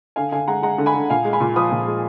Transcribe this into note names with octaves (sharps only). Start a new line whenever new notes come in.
D3 F5 G#5
D3 F5 G#5
G#3 F#5 A#5
G#3 F#5 A#5
D3
G#5 B5
D3
A#2 F5 G#5
G#3
G#5 B5
A#2
F3 B5 D#6
A#2
G#3